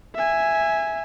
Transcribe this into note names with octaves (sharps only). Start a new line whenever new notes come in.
E5 G#5